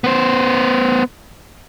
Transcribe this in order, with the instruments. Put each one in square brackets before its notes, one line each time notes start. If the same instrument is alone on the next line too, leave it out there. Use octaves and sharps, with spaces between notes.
[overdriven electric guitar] B3 C5